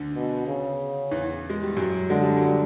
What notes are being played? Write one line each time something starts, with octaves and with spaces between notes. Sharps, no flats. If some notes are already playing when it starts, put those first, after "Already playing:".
Already playing: D2 D3
B2
C#3
E2 E3
G#3
G3
F#2 F#3
D3 G#3
G3
F#3
G3